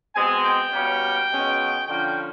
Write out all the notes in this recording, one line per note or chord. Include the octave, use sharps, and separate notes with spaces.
B2 G#3 C4 G#5
G5
B2 G3 A#3 C#4
B2 G#3 C#4
D3 F3 A#3 C#4 G5